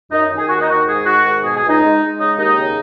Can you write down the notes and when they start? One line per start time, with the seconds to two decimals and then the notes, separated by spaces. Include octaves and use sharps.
0.11 F#2 D#4
0.31 D#3
0.38 G#4
0.49 D#2 F#4
0.61 D#4
0.69 D#3 F#4
0.87 G#2 G#4
1.06 D#3 F#4
1.25 G#2
1.44 B2 G#4
1.57 G#4
1.63 C#2
1.69 D#4
1.82 G#3
2.01 G#3
2.19 C#3 D#4
2.38 D#2 D#4
2.57 C#3